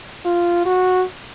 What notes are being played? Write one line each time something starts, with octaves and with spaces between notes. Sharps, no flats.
F4
F#4